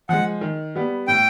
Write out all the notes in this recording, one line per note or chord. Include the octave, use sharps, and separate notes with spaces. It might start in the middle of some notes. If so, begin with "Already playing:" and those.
F3 G#3 F#5
D#3
G3 B3
A2 G5